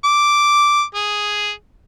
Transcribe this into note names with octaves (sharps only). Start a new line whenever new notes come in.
D6
G#4